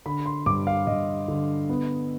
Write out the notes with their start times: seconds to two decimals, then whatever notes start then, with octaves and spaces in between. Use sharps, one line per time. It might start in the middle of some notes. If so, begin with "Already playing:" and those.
0.06 D3 B5
0.26 C6
0.46 G2 D6
0.67 F5
0.87 G2 D#5
1.28 D3
1.69 B3